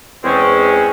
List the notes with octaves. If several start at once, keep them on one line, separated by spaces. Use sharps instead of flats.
E2 G#3 C4 C#4